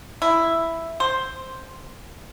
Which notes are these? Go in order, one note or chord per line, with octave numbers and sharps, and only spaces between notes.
E4
C5